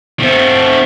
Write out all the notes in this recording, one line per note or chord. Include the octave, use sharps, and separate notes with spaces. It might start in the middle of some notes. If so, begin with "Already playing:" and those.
A3 C4